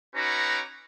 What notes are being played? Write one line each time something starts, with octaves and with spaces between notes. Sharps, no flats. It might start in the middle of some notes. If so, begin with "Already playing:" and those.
C#4 D#4 F#4 B4 A#5 D6